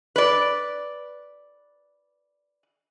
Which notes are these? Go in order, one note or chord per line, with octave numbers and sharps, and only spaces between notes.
B4 D5